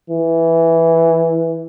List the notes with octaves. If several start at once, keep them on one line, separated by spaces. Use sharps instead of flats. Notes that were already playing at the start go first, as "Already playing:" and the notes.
E3